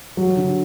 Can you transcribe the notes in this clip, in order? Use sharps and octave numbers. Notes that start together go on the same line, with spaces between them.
F#3
D3